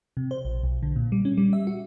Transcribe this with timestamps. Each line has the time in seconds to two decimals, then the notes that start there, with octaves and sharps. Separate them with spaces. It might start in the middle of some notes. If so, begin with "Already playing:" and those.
0.17 C3
0.31 C5
0.45 A#1
0.63 B1
0.83 D3
0.96 A#2
1.12 G3
1.25 C#4
1.37 G3
1.53 E5
1.67 F#4